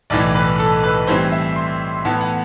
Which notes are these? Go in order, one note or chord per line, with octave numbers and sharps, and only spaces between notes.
B1 A2 E3 D5
B4
A4
B4
A2 E3 G3 C4 C5
E5
C6
A2 E3 B3 A5
F#5